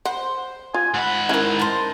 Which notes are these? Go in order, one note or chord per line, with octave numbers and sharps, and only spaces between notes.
C5 F#5
F4 G#5
G#2 F#5 B5
C#4 E4 A#4 G#5
A#4 C5 A5